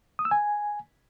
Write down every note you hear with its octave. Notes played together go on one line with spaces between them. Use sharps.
D#6
E6
G#5